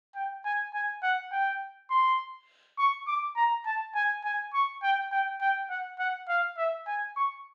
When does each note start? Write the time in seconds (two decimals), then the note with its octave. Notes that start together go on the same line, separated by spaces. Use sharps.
0.15 G5
0.45 G#5
0.74 G#5
1.03 F#5
1.32 G5
1.90 C6
2.78 C#6
3.07 D6
3.36 A#5
3.66 A5
3.95 G#5
4.24 G#5
4.54 C#6
4.83 G5
5.12 G5
5.41 G5
5.70 F#5
5.99 F#5
6.28 F5
6.58 E5
6.87 G#5
7.16 C#6